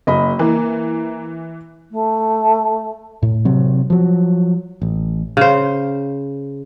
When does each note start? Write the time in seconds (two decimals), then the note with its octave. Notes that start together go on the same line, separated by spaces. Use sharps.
0.07 F#1 D#5 B5
0.39 E3 A#3
1.91 A3
3.23 A2
3.45 C3 F#3 C4
3.90 F3 F#3
4.82 A1
5.37 C#3 C5